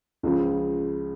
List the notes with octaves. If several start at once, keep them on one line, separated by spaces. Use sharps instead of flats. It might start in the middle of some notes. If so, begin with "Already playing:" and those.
C#2 C#3 F3